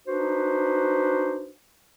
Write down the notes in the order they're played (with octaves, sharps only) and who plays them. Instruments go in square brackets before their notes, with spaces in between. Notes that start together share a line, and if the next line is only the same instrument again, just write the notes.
[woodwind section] D4 D#4 F#4 B4 C5